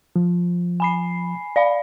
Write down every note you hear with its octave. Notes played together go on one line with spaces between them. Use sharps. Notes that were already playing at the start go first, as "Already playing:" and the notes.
F3
G#5 B5 C7
D5 F5 B5